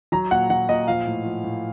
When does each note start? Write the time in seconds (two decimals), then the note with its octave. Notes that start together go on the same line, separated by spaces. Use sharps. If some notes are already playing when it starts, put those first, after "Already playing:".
0.12 F#3 A#5
0.31 A#2 F#5
0.50 F#3 F#5
0.69 A#2 D#5
0.88 F3 F5
1.06 A2
1.25 F3
1.44 A2